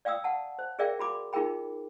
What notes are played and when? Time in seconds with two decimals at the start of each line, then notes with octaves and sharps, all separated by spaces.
0.05 D5 F5 G5 D#6 E6
0.24 F#5 A5
0.59 C5
0.79 G#4 A#4 D5 E5 F5 G5
0.99 F#4 B5 D6
1.33 D#4 F4 G#4 A#4 G5 B5